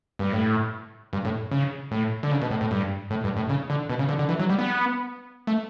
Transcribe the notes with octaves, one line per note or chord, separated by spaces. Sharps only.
G2
A2
G2
A2
C#3
A2
D3
C#3
B2
A2
A2
G2
A2
G2
A2
C#3
D3
B2
C#3
D3
D3
E3
F#3
G3
B3
A3